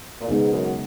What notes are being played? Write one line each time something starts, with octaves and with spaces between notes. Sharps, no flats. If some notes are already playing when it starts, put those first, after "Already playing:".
A#2
G#2 C#3 G#3 B3 D#4
F#2